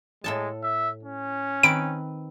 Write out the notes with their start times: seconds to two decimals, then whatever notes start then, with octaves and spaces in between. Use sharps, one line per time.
0.24 A2 G#3 A4 A5
0.63 E5
1.03 C#4
1.63 D#3 C4 B4 D7